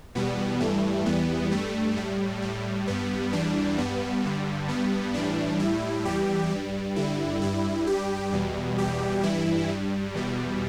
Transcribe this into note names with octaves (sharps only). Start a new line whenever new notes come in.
E2 B2 G3 B3
G2 E3 G3 A3
E2 E3 G3 B3
G2 G3 A3
A2 G3
A2 G3
G2 G3 B3
E2 E3 G3 D4
G2 G3 B3
G2 D3 G3
G2 G3 B3
A2 E3 G3 D4
A2 G3 E4
E2 E3 G3 G4
G2 G3
G2 D3 G3 E4
G2 G3 E4
G2 G3 G4
E2 B2 G3
E2 B2 G3 G4
G2 E3 G3 E4
G2 G3
E2 B2 G3